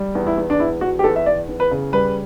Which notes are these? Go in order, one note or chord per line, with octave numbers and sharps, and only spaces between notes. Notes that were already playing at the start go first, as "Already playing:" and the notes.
Already playing: G3
E2
E4
E2
D4
E2 E4
E2 F#4
G4
E2 A4
E5
E2 D5
E2
B4
C#3
G3 B4